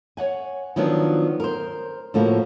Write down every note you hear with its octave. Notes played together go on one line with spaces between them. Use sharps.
C#5 D5 F#5 G#5
D#3 F3 F#3 B3 D4
A#4 C5
A2 F3 A#3 F#4